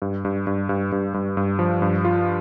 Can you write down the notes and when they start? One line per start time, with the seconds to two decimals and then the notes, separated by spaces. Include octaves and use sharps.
0.02 G2
0.25 G2
0.47 G2
0.69 G2
0.92 G2
1.14 G2
1.37 G2
1.59 F3
1.82 G2
2.05 F4